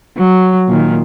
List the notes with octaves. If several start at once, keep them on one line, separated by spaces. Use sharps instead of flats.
F#3
A#2 D#3